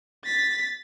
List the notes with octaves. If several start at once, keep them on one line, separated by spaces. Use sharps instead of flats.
A6 B6